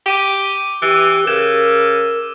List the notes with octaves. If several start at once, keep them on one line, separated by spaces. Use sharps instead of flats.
G4 D6 D#7
E3 G4 E6
C#3 A#4 E7